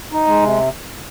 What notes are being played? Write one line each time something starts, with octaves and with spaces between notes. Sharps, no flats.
D#4
G#3
C3